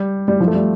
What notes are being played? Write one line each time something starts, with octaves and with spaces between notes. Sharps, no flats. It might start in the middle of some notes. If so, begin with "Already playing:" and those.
Already playing: G3
G3
F3
A3
G3